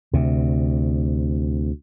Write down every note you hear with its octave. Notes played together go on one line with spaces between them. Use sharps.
D2 C3